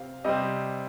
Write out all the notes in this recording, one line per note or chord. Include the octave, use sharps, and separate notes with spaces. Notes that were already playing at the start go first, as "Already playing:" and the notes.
Already playing: C3 C4 F5
C3 G3 C4 D#5